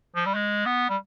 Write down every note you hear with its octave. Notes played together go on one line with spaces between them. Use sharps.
F3
G3
G#3
B3
G3